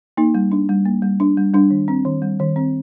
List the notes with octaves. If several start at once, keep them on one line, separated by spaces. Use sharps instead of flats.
A#3 D#4
G3
D4
G3
A#3
G3
D4
G3
G3 D4
D#3
C4
D#3
G3
D#3
C4